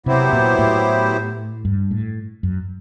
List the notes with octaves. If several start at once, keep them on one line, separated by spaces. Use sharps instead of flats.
C3 F#3 B3 E4 G4 C5
A#2
A2
G2
A2
F#2